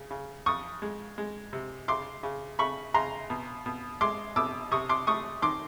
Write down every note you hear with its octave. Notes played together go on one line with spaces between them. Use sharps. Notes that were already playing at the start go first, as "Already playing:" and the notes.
Already playing: C#3
C#3
F2 C#6 D#6
G#3
G#3
C3
C#3 C6 D6
C#3
C#3 B5 C#6
C#3 A#5 C6
B2
B2
G#3 C6 D6
B2 D6 E6
C3 C#6 D#6
C6 D6
A3 C#6 D#6
D#3 C6 D6